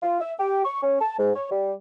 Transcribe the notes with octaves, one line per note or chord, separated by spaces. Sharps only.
F4
E5
G4
C#6
C#4
A5
G#2
C#5
G3